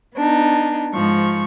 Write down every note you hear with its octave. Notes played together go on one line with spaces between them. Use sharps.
B3 D4 D#4
G#2 F3 C#6